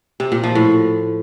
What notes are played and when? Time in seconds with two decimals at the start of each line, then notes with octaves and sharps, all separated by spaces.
0.20 C3
0.32 A#2
0.44 F3
0.55 A2